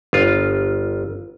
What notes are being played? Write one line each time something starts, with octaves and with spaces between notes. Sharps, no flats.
G1 F4